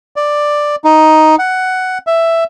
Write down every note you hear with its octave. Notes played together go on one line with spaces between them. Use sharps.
D5
D#4
F#5
E5